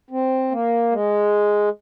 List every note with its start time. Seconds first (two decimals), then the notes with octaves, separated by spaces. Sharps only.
0.11 C4
0.51 A#3
0.92 G#3